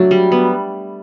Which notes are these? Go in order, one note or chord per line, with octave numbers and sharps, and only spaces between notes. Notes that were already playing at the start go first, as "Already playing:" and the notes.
Already playing: F#3 A3 D4
G3
B3